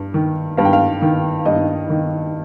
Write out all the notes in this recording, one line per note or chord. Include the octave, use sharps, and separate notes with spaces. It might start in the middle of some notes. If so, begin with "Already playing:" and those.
Already playing: G2
D#3
G2 F5
G5
F5
D#3
G2 D#5
D#3